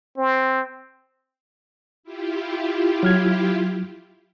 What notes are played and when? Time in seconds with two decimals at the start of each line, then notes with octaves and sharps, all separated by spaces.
0.18 C4
2.03 E4 F4 G4
3.03 F#3 F6 G#6